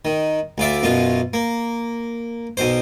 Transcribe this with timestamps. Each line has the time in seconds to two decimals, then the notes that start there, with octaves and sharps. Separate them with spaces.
0.05 D#3
0.58 D2 F4 D5 E5
0.83 F#2 B2 F4
1.33 A#3
2.57 B1 B2 C5